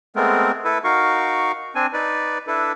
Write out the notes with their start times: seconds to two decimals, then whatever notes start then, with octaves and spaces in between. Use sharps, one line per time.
0.16 G#3 A3 B3 C4 A#4
0.65 E4 A4 B4
0.84 D#4 F#4 A#4 F5 C#6
1.75 C4 D4 G#5
1.93 D#4 B4 D5
2.47 D4 E4 A4 B4